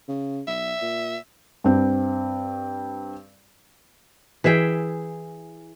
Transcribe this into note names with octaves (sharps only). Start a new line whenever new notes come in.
C#3
B1 E5
A#2
G2 C4
E3 G#4 E5 G5